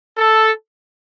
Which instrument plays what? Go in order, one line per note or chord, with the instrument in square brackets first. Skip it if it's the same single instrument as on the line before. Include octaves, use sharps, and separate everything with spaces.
[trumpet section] A4